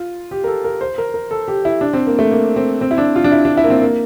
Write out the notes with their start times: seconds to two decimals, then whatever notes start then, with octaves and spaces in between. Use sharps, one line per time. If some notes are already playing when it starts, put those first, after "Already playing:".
Already playing: F4
0.31 G4
0.44 A#4
0.47 A4
0.64 A#4
0.81 C5
0.98 A#4
1.14 A#4
1.31 A4
1.48 G4
1.65 E4
1.81 D4
1.93 C4
2.07 A#3
2.19 A3
2.32 A#3
2.56 C4
2.81 C4
2.91 E4
2.98 D4
3.16 F4
3.24 D4
3.32 E4
3.45 D4
3.57 E4
3.64 A#3
3.70 C4
3.82 A#3